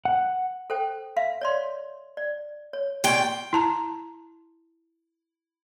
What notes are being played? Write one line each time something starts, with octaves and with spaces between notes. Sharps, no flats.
F#5
A4 C5 G5
E5 F5
C#5 D5 C6
D5
C#5
A#2 D5 G5 G#5 C#6
E4 A5 A#5